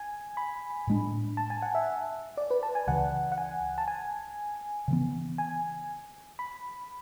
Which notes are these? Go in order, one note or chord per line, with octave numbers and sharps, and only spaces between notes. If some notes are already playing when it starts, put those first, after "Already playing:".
Already playing: G#5
B5
A2 G#3 D4
A5
G#5
F#5
E5
D5
B4
A5
G#5
C#2 C#3 E3 F#5
F#5
G#5
A5
G#5
C#3 E3 B3
G#5
B5